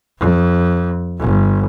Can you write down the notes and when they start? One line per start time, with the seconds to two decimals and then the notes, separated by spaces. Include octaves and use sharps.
0.19 F2
1.19 G1